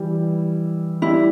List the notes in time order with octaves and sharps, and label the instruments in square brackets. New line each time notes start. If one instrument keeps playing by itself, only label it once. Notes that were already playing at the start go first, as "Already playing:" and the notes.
Already playing: [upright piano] E3 G3 E4 G4
[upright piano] G3 D4 G4 [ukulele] E4